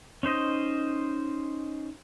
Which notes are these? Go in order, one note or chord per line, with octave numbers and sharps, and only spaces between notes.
C#4 D#4 C5 D#5